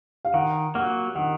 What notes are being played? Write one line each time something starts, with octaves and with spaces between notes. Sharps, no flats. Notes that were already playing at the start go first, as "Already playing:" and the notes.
F5
D#3 F#5
F#3 A#3 F#5
D#3 F#5